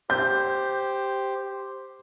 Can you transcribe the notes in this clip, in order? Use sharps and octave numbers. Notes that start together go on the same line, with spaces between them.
G4 C5 G6